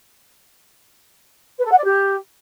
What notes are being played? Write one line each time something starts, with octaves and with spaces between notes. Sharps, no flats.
B4
A4
F#5
D5
G4